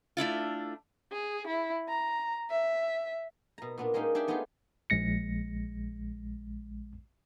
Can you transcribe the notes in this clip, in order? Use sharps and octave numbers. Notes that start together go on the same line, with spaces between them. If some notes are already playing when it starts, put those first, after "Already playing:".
A3 D4 E4 F4
G#4
E4
A#5
E5
B2 A#5
A#2 B3 D4
G#3 A#3 C#4 D#4 G4
D4 G4 G#4 E5 G5
A3 B3 D#4 F4 G4 G#4
A#1 G#3 A#6 C#7